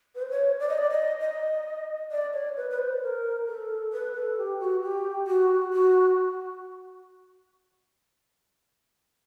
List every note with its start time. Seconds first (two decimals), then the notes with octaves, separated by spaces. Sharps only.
0.15 B4
0.22 C5
0.31 C#5
0.60 D5
0.69 D#5
0.78 D5
0.91 D#5
1.21 D#5
2.11 D5
2.33 C#5
2.57 B4
2.71 B4
2.79 C5
3.02 A#4
3.47 A4
3.93 B4
4.14 A4
4.38 G4
4.60 F#4
4.83 G4
5.27 F#4
5.73 F#4